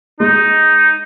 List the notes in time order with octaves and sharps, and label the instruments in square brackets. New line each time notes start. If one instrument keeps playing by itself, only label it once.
[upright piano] G#3 [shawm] D#4